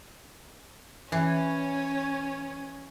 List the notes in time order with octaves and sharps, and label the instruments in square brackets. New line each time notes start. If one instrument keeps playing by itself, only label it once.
[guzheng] E3 [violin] C#4 C#5